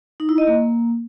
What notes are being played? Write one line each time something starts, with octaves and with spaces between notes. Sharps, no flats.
D#4
E4
D#5
A#3